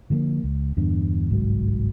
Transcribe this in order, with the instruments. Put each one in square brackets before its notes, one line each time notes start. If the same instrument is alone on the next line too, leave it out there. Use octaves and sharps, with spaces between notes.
[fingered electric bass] D3 F3 G3 A#3
C#2
E2 G2 D3
G1 C2 G#2 F#3